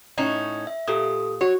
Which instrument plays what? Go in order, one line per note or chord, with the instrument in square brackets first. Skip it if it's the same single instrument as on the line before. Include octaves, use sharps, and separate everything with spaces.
[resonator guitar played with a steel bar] A2 C#4 D#4
[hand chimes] E5
[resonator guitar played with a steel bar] A#2 [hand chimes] G4 A4 D#6
[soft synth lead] F#4 [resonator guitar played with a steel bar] C#5